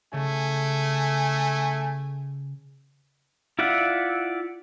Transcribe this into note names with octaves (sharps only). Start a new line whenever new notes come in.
C#3 A3 G#5
E4 F4 D5 E5 F#5